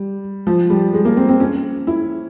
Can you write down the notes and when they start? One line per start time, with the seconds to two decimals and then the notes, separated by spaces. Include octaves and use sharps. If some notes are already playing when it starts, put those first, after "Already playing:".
Already playing: G3
0.47 F3
0.70 G3
0.94 G#3
1.05 A#3
1.17 C4
1.29 C4
1.40 C#4
1.87 E4